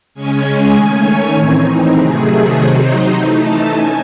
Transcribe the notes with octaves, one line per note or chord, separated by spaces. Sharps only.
C#3 G#3 C#4 G#5
D#3 A3 C#4
C#5
A2 E3 C4 D#4
C3 D#3 F#3 A3 G#4
C3 F#3 C4 D#4
E3 A3 D#4
A5
C#4 G#5